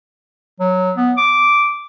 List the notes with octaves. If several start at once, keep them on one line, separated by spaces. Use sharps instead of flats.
F#3
B3
D6